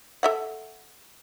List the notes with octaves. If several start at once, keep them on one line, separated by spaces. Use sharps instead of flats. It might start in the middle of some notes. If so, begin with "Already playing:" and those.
A4 E5 F#5